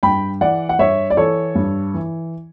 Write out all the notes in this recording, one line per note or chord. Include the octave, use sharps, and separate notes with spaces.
G2 G5 B5
E3 D5 F#5
F#5
G2 C#5 E5
D5
E3 A4 C#5
G2
E3